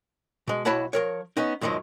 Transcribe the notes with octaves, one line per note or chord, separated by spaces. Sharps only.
B2 G#3
B1 E4 F#4 C#5 A5 B5
F3 A#4 C#5
B3 C#4 D#4
E2 G#2 D#3 F3 F#3